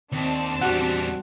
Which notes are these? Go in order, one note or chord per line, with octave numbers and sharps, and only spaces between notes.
D#2 C4 D4 A5
E2 G3 F#4 F#5